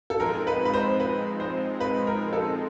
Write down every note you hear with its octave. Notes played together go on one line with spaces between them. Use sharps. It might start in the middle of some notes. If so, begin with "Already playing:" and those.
A4
F3 G#3 C4 D#4 A#4
B4
B4
C5
B4
C5
B4
A#4
A4